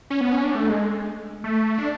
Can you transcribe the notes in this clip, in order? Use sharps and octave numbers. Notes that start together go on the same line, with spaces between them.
C#4
B3
C#4
D4
A3
G#3
A3
D4